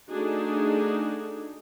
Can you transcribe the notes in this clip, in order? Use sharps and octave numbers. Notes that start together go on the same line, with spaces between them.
A3 D4 D#4 F#4 G#4